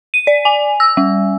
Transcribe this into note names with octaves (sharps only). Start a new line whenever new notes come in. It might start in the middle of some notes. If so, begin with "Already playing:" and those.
D#7
D5
G#5
E6
G3